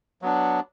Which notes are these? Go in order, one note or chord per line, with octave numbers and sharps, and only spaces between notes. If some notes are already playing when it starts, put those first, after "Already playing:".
F#3 B3 D4